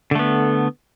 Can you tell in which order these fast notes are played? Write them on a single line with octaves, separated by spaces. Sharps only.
D3 A3 B3